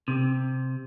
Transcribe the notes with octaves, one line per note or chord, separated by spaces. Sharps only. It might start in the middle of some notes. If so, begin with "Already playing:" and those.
C3